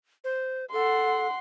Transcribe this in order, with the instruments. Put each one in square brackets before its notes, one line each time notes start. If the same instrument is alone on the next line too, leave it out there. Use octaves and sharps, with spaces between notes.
[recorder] C5
[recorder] A4 [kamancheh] F#5 C6